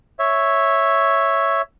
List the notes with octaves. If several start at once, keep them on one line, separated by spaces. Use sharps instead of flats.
C#5 E5